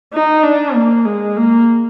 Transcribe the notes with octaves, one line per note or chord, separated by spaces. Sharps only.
D#4
D4
A#3
G#3
A#3